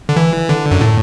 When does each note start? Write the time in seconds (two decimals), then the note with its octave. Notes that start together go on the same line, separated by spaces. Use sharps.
0.09 D3
0.16 E3
0.49 D3
0.71 F#2
0.81 A2